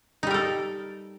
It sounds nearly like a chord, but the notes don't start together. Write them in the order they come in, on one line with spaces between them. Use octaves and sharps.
D#4 G3 A#4 A4